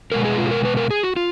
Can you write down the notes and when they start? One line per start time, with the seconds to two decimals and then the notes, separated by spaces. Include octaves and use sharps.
0.12 B2 G#3 B3 A#4
0.25 G#4
0.38 F4
0.46 G#4
0.51 A#4
0.65 B4
0.77 A#4
0.91 G#4
1.03 F#4
1.16 F4